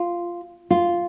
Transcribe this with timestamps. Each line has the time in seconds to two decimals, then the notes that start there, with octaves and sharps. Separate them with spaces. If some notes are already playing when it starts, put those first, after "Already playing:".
Already playing: F4
0.70 F4